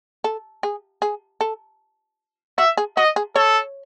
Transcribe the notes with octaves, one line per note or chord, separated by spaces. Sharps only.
A4
G#4
G#4
A4
F#4 E5
G#4
F#4 D#5
G#4
A4 C#5